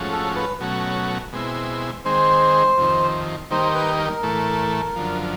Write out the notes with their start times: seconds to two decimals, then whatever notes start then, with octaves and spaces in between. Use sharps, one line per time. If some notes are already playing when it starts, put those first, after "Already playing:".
Already playing: G#2 F3 A3 C#4 F#4
0.11 A4
0.36 B4
0.60 B2 F#3 A3 C#4 F#4
1.33 B2 G#3 C4 E4
2.05 D#3 G#3 C4 C5
2.78 F2 C3 D#3
3.50 D#3 G3 A#3 D#4 C5
3.74 B4
3.99 A#4
4.23 A2 E3 A3
4.96 F#2 D3 F3